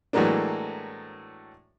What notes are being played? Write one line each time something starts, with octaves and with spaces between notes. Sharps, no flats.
A2 E3 F#3 G#3 A#3 D4